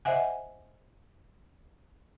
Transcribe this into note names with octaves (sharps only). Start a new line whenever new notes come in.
C5 D#5 E5 F#5 G#5